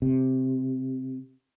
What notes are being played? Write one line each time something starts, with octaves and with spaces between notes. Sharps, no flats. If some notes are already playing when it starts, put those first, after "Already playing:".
C3